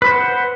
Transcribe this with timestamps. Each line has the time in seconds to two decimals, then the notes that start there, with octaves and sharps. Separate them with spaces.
0.02 B4
0.06 C5
0.11 F#5